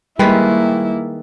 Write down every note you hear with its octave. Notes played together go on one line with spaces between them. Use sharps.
D#3 G3 G#3 A#3 E4 B4